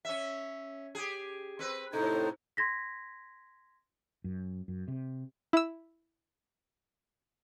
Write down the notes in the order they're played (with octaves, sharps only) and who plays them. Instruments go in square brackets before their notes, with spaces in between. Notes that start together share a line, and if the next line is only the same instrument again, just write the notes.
[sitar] C#4 E5
G4 G#4
C4 B4
[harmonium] A2 D#4 C5 [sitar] C3 [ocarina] A4
[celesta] C6 G#6 A#6 B6
[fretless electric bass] F#2
F#2
C3
[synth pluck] E4 E6